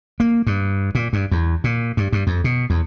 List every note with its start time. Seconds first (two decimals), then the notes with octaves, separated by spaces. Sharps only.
0.20 A#3
0.47 G2
0.95 A#2
1.13 G2
1.32 E2
1.64 A#2
1.97 G2
2.13 G2
2.27 F2
2.44 B2
2.70 E2